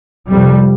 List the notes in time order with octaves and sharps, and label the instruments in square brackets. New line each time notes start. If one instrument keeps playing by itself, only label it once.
[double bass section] F2 C3 G3